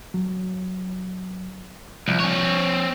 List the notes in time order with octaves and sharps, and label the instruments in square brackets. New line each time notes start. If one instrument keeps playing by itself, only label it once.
[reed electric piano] F#3
[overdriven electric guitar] C2 [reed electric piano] F3
[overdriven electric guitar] C4 C#5